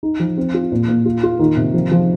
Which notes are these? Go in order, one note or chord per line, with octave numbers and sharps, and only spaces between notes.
D#4
F3
C4
F4
A#2
A#2
F4
F4
D#3
C3
F3
F3